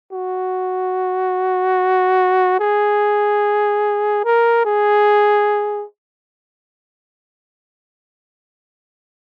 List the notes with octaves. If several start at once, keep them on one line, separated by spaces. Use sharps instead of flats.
F#4
G#4
A#4
G#4